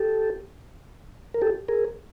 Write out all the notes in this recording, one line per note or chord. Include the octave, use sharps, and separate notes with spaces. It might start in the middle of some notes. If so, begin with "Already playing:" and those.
Already playing: G4 A4
A#4
G4 A4
G#4 A#4